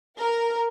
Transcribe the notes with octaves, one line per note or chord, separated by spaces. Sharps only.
A#4